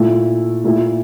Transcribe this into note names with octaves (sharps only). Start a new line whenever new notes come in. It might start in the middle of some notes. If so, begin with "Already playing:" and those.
Already playing: A#2 A3 E4
A#2 A3 E4